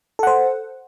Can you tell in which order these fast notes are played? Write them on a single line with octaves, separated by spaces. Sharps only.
A4 F#5 C5